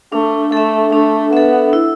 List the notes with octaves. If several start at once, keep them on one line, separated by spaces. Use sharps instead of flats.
A3 D4
A3 A4 E5
A3 D4
B3 A4 E5
E4